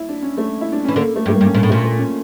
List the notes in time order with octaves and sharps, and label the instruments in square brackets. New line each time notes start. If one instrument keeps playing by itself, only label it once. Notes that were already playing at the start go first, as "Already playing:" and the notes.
Already playing: [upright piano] E4
D4
C#4
A3
E4
D4
[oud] E3 [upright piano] C#4
[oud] D3 [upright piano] A#3
[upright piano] A3
[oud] G2
[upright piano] A3
A#3
[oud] G2
[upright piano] C#4
[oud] A#2 [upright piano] A#3
[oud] A2
[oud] A#2 [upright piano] A3
[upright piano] A#3
C#4